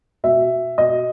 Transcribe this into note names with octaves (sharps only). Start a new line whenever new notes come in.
B2 E5
B2 D#5